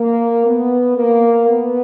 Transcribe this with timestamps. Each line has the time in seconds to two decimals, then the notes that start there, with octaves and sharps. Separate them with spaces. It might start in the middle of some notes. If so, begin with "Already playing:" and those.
Already playing: A#3
0.46 B3
0.97 A#3
1.49 B3